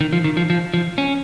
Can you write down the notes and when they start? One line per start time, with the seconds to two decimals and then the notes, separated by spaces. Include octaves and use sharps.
0.01 D#3
0.13 F3
0.24 D#3
0.37 F3
0.50 F3
0.74 F3
0.98 C#4